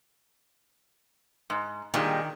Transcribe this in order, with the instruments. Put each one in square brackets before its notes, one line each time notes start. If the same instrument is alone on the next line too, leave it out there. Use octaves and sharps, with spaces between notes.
[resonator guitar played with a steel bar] G#2
[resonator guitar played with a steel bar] A#2 G3 G#3 [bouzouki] D#3